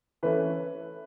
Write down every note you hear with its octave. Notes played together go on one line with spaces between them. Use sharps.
E3 A3 C#4 B4